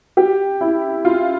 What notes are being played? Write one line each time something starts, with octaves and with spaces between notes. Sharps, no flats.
G4
E4
F4